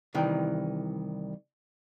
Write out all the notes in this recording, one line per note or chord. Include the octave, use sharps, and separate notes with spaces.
C2 D#3 E3 G5